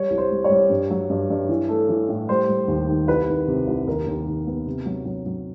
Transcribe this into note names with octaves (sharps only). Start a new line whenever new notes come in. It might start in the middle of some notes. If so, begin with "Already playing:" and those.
Already playing: G3 C#5
C2
C5
G3
C#5
G3
G2
F#3
G2
G2
E3
A3
E3
A2
G3 C5
G3
D#2
D#3
C2 B4
D#3
C3
C2
D#2 A#4
D#2
D#3
B3
C3
F#3
F#3
F#3